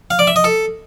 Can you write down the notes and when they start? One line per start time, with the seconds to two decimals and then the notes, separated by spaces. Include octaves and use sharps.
0.11 F5
0.19 D5
0.27 E5
0.36 D#5
0.44 A4